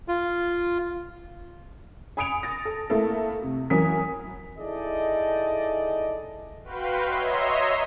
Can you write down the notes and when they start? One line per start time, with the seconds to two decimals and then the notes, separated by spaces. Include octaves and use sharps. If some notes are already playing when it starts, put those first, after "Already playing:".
0.08 F4
2.17 G#5 B5 D#6 C#7 D7 F7
2.43 A6 A#6
2.65 A4
2.90 A3 A#3 E4 A4
3.42 C3
3.70 E3 F#3 C#4 A#4 D#6 B6
4.58 D#4 E4 G#4 A4 D5 D#5
6.64 F#4 B4 F5 G5 C6
7.06 C#5 D#5 E5 A#5 C6